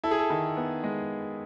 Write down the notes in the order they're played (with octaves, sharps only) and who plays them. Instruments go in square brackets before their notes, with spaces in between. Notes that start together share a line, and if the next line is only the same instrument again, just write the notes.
[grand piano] E4 A4
G#4
A4
D#3
B3
G#3